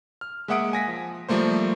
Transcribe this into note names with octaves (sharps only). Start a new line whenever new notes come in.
F6
G#3 A#3 E5 F#5 D#6 D7
G#5 A#6 B6
F3
F3 G3 A3 A#3 C5